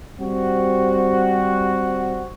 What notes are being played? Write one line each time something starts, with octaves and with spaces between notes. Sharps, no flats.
G3 C4 F#4